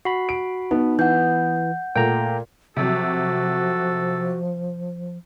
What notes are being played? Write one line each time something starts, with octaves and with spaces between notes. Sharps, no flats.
F#4 B5 C7
D7
B3 D#4
E3 F#5 G6
A#2 A3 G5 A#5
C3 F3 F#3 F#4 A4